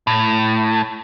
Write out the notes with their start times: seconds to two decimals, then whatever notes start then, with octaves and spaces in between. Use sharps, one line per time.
0.07 A2